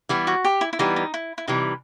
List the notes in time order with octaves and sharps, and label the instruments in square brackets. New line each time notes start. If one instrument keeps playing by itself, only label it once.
[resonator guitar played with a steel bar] E3 G3 B3
[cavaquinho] F#4
G4
E4
E4
[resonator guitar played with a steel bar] E3 G3 B3 [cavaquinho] D#4
[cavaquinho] D#4
E4
E4
[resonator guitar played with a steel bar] C3 E3 G3 [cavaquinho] D#4